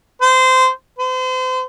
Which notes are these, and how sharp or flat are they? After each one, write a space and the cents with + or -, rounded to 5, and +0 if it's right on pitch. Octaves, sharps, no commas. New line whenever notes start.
C5 -20
C5 -35